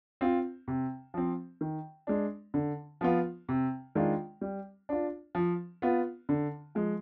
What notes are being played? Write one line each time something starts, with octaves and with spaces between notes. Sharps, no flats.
C4 F4
C3
F3 C4
D#3
G#3 D4
D3
F3 B3 F4
C3
D#3 G#3 D4 F4
G3
D4 F4
F3
B3 F4
D3
F3 G#3